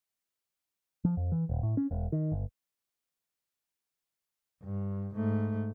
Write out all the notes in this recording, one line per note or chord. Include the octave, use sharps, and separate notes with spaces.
F3
F2
E3
D#1
A2
C#4
E1
D#3
G1
G2
G#2 A3